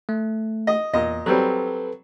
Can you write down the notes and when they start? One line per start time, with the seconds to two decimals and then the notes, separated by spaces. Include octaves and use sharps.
0.09 A3
0.67 D#5
0.93 E2 A#2 D#5
1.26 F#3 G3 C4 A4 B4